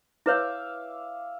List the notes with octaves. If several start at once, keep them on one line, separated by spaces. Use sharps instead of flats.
E4 B4 C#5 E5 F5 D6